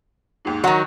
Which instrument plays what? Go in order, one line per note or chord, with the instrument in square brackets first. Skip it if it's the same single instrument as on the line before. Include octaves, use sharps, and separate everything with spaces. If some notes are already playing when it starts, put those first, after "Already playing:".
[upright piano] D#2 G#2
[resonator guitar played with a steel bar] D#3 F#3 [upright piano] F#5 A#5